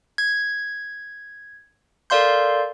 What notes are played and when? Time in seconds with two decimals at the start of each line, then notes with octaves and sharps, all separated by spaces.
0.18 G#6
2.10 A4 A#4 D5 F5 C6 G6